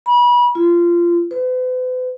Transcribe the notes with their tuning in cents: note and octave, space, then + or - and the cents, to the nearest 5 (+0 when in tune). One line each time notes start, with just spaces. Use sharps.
B5 -30
F4 -20
B4 +45